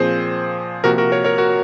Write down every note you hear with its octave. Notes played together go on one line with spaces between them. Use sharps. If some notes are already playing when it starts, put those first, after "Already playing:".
Already playing: A#2 F3 C4 G#4 C5
C3 F3 A#3 F#4 A#4
F#4 A#4
A#4 C#5
A#4 C#5
F#4 A#4